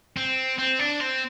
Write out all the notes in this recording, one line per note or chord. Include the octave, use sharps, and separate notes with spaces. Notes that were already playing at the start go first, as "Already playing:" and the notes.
C4
C4
D4
C4